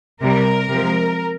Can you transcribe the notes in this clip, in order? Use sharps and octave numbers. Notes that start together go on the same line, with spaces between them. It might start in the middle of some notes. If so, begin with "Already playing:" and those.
C3 G3 A#4
C3 F3 G#3